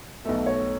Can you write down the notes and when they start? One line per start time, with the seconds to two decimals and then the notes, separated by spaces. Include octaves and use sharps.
0.25 B1 B2 A3 E5
0.46 C#5